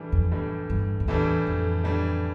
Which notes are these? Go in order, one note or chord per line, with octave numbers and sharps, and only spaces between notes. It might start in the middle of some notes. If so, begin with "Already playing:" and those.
Already playing: A2 E3 G3 D4
F2
A2 E3 G3 D4
G2
F2
E2 A2 E3 G3 D4
F2
A2 E3 G3 D4